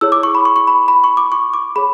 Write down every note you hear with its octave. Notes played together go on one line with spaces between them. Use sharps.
E4 G#4 C#5 E6
D6
C#6
B5
C#6
C#6
B5
B5
C#6
D6
C#6
D6
G#4 C#5 B5